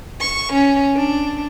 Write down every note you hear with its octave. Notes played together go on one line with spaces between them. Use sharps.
C#6
C#4
D4